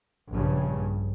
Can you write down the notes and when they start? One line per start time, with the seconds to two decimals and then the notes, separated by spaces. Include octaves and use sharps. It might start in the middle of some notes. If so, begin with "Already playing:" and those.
0.34 A#1 G2 C#3